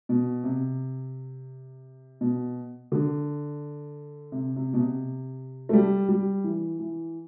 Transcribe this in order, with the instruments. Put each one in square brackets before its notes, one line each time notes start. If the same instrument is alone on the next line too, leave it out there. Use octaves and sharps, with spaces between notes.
[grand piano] B2
C3
B2
D3
C3
C3
B2
C3
A3
G3
G3
E3
E3